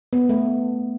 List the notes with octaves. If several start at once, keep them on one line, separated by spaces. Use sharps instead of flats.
B3
A3